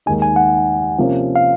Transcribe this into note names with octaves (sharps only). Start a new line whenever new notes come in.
D#2 D#3 G#3 D#4 G#5
G#5
F#5
C3 F3 A#3 C#4
F5